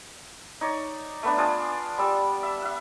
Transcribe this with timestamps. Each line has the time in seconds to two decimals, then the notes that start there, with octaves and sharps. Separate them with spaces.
0.61 D#4 C#5 D5
1.23 A3 B3 D4
1.37 D4 F4 G#4 D5
1.98 G3 E6
2.43 E5
2.62 E5 F#5